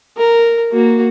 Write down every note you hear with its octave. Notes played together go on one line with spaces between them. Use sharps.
A#4
A#3 F#4